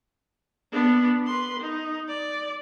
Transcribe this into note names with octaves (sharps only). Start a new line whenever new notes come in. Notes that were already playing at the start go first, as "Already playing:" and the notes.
B3 D4
B4 C6
D#4
D5